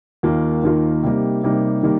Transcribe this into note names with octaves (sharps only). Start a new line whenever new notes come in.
D#2 D#3 A#3 F4
D#2 D#3 A#3 F4
C3 G3 A#3 D#4
C3 G3 A#3 D#4
D#3 G3 A#3